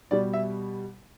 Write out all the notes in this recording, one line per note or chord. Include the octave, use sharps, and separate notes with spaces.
B2 G3 D5
E5